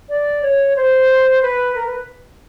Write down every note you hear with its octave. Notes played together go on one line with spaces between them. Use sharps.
D5
C#5
C5
B4
A#4
B4